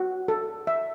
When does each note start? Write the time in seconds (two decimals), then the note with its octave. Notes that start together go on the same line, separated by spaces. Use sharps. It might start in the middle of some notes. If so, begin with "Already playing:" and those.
Already playing: F#4
0.28 A4
0.67 E5